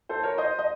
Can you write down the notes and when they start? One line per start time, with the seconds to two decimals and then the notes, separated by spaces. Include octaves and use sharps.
0.09 A4 C5
0.23 A#4 C#5
0.38 C5 D#5
0.58 D#5